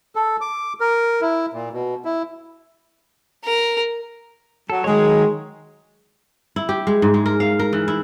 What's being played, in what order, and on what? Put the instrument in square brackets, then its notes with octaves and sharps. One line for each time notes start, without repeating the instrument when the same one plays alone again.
[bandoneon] A4
D6
A#4
E4
A#2
B2
E4
[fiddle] A#4
[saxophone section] F#3 [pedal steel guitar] A4
[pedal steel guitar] D#3 F#3 C#5 [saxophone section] G#3
[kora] E4
G4
G#3
G#2
G#3
A#4
F5
A#4
E3
E4